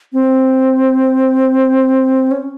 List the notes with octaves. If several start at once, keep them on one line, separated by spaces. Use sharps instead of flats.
C4
C#4